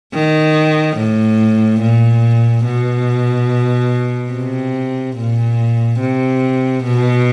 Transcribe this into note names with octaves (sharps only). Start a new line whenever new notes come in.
D#3
A2
A#2
B2
C3
A#2
C3
B2